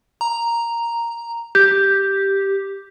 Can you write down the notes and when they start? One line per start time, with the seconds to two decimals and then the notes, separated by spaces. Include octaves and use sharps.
0.21 A#5
1.55 G4 G6